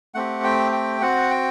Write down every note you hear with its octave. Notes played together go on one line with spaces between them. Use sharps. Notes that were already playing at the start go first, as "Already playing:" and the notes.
A3 C4 G4 F#5
G5
G5
C4 F#4 F#5
G5